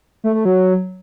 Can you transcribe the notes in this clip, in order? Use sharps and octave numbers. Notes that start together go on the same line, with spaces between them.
A3
A3
F#3